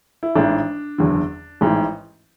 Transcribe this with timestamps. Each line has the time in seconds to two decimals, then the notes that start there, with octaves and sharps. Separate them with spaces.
0.23 E4
0.36 A1 G#2 E3 D4
0.98 F#1 E2 D3
1.61 A1 G#2 E3